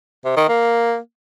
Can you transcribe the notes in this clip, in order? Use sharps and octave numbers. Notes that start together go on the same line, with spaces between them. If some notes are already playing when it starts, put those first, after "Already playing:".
C3
D#3
A#3